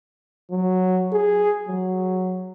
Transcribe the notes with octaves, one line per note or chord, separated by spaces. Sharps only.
F#3
G#4
F#3